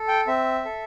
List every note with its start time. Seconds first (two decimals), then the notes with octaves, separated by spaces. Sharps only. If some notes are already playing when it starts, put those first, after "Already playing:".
Already playing: A4
0.08 G5
0.27 C4 E5
0.65 A4